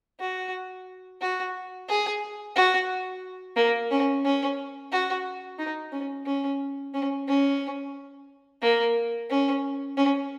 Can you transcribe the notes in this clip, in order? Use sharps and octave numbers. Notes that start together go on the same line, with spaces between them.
F#4
F#4
G#4
F#4
A#3
C#4
C#4
F#4
D#4
C#4
C#4
C#4
C#4
A#3
C#4
C#4